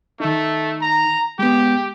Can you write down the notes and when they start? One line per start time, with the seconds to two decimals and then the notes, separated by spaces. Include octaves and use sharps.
0.20 D#3 A3 D#4
0.82 A#5
1.39 G#3 B3 G4